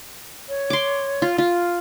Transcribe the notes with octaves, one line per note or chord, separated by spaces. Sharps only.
C#5
C6 D6
F4
F4